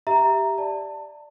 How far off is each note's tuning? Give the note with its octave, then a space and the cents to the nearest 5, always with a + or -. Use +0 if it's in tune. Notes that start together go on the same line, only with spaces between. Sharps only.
G4 +0 E5 +0 A#5 +0
D5 +0 A5 +25